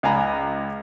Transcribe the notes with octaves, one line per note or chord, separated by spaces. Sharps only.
C#2 F5 G#5 A#5 B5